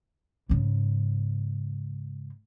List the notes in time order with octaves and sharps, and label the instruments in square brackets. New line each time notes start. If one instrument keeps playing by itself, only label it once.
[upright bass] G#2 C#3